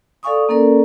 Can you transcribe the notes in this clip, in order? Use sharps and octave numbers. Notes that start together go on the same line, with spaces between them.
A4 D5 F5 G#5 C#6 D#6
A#3 C#4 A4 A#4 D5